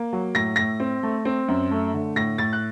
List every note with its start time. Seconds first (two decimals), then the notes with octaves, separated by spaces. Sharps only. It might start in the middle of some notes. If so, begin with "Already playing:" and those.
Already playing: A#3
0.13 F#3
0.35 A2 A#6
0.56 A2 A#6
0.80 C4
1.03 A3
1.25 C4
1.48 F#2
1.71 A3
1.94 D3
2.16 A2 A#6
2.38 A2 A6
2.53 F#6